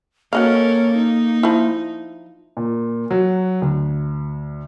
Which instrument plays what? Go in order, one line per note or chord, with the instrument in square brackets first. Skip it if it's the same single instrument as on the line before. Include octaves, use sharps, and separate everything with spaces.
[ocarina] A#3 [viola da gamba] C#4 A4 A#4 [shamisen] F#4 D#5 F5
[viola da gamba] D#4
[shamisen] F3 E4
[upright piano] A#2
F#3
D2